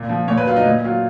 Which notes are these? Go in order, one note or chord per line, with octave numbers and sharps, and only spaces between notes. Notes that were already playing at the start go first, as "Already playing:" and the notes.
Already playing: A#2
F3
A#2 C#5
B4
F#3 F4
D#4
A#2
F#3 F4